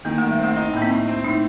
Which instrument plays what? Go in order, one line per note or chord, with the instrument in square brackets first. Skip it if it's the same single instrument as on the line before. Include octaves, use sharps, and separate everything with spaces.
[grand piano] D#3 [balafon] A#3
[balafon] A3
[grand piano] D#3
[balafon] G3
[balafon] A3 [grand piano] C4
[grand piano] D#4
[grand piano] A2 [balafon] A#3
[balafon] C4
[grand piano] A2
C4
[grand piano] A2 [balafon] D#4